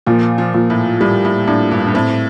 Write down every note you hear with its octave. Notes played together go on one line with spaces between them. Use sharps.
A#2 F3
F3
A#2
A2
A2 G3
A2
A2 D4
G2
G2
A2 C4